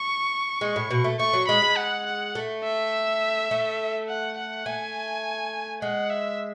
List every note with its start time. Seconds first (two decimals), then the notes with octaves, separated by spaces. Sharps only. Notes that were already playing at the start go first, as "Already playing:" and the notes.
Already playing: C#6
0.61 G#3
0.76 A2
0.91 B2
1.04 A3
1.20 A3 C#6
1.33 F#3
1.48 G#3 B5
1.62 G#3
1.77 F#5
2.06 F#5
2.35 A3
2.64 E5
3.51 A3
4.09 F#5
4.38 F#5
4.66 A3 G#5
5.82 G#3 F#5
6.10 E5